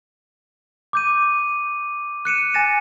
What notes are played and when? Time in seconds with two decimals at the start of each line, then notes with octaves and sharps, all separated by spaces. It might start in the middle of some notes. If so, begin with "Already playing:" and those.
0.93 D6 G6 D#7
2.25 F#6 C#7 D#7 E7
2.54 G#5 F#6 A6 A#6 E7